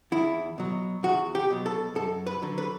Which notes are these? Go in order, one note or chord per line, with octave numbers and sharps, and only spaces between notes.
E2 E4
B2 F#3
E2 F#4
G4
B2 F#3
A4
F#2 A4
B4
D3 F#3
B4